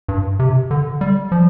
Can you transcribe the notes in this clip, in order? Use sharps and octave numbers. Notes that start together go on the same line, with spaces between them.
G2
C3
D3
G3
F3